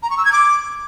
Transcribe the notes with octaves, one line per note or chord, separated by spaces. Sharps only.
A#5
C#6
E6
G#6
D6